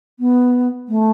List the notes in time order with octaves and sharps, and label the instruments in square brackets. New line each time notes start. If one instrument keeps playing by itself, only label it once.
[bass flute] B3
A3